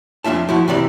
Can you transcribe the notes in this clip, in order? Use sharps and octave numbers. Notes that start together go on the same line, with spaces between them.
F2 D4 F4 E5 A5
F3 E4 F#4
C3 E3 D5 B5